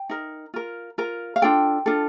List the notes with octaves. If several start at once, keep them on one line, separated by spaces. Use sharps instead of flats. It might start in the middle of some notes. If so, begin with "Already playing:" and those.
Already playing: G5
D#4 A#4
F4 A#4
F4 A#4
F5
D4 F4 A4 G5
D4 F4 A4